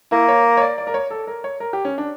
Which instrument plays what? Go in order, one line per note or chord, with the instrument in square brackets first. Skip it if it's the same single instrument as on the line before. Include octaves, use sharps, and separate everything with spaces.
[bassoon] A#3 [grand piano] E4
[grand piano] C#5
C#5
D5
D5
A#4
C#5
A4
A#4
C#5
A#4
G4
C#4
D4